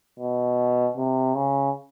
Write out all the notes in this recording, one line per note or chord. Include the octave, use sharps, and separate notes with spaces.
B2
C3
C#3